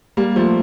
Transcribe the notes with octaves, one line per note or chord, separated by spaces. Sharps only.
G3 A#3
F3 A3